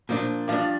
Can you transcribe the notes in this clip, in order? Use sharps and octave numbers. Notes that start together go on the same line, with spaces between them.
A#2 F3 D4
G2 F3 D4 F5